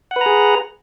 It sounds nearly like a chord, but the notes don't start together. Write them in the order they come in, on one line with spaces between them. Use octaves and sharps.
F#5 B4 A#5 G#4